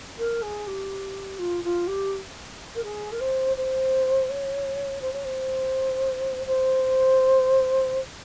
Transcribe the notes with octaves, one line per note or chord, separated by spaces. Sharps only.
A#4
G#4
G4
F4
F4
G4
A#4
G#4
A#4
C5
C5
C#5
C5
C#5
C5
C5